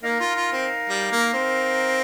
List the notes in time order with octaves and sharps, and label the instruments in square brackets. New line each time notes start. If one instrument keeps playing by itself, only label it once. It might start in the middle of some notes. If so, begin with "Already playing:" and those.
[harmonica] A#3 [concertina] D#4 A#4 F5
[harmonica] F4
F4
C4
G3
A#3
C4